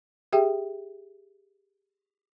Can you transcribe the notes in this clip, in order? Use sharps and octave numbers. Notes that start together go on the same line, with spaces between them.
G4 G#4 E5 G5